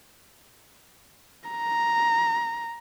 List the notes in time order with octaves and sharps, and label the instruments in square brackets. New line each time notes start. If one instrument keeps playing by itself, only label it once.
[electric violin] A#5